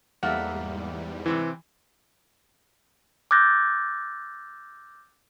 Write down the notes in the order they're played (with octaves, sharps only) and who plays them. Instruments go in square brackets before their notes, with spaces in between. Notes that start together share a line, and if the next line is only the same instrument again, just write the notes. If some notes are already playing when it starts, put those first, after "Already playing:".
[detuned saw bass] E2 [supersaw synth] G#2 G3 [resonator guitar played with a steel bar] A#3 A4 E5 [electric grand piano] F#5
[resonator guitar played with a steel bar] C3 C4 E4 [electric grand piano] E3
[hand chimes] D6 E6 F#6 G6 A6 A#6